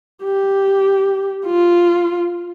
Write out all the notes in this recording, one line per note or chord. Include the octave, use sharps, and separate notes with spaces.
G4
F4